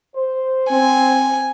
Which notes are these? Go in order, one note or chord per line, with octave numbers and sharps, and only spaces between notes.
C5
C4 G#5